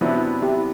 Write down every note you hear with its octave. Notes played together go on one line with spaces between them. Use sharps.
C3 F#3 B3 D4 E4
E4 G4